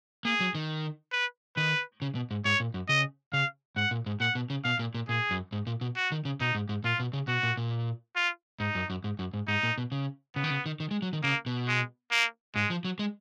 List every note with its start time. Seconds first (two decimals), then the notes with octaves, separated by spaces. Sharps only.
0.25 A#3 G#4
0.40 F#3
0.55 D#3
1.13 B4
1.57 D#3 B4
2.02 C#3
2.15 B2
2.31 G#2
2.45 G#2 C#5
2.60 A#2
2.74 F#2
2.89 C#3 D#5
3.33 C#3 F5
3.76 G#2 F#5
3.91 A#2
4.06 G#2
4.20 A#2 F#5
4.35 B2
4.50 C#3
4.64 B2 F5
4.79 A#2
4.94 A#2
5.09 A#2 G#4
5.31 F#2
5.52 G#2
5.67 A#2
5.81 B2
5.96 F#4
6.12 D#3
6.25 C#3
6.41 B2 D#4
6.55 G#2
6.69 G#2
6.84 A#2 F4
7.00 B2
7.13 C#3
7.28 B2 F#4
7.43 A#2
7.57 A#2
8.16 F4
8.60 G#2 D#4
8.75 F#2
8.90 F#2
9.04 G#2
9.19 F#2
9.34 G#2
9.48 G#2 D#4
9.63 A#2
9.78 B2
9.92 C#3
10.36 C#3 B3
10.44 D#3
10.50 C#3
10.66 D#3
10.80 D#3
10.91 G#3
11.02 F#3
11.13 D#3
11.23 C#3 A#3
11.46 B2
11.68 G#3
12.12 A#3
12.55 G#2 G#3
12.70 F3
12.85 F#3
12.99 G#3